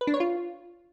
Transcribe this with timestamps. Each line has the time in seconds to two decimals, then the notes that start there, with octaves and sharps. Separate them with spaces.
0.01 B4
0.07 D4
0.14 C#5
0.20 F4